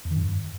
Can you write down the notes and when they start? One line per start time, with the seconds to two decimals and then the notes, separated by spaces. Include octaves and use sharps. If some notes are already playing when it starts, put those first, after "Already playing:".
0.05 E2
0.11 D#3
0.17 F#2
0.23 G2